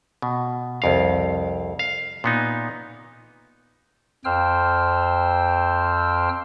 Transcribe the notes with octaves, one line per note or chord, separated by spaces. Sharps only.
B2
C2 F2 F5
F5
A#2 B3 D#4
F2 C5 G5 E6 F6